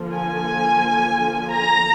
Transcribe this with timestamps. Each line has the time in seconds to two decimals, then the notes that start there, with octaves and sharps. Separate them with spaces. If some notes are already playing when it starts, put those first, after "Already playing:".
Already playing: D3 F3 A#3
0.12 G#5
1.52 A#5